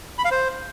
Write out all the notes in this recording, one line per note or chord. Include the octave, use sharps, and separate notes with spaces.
B5
F5
C5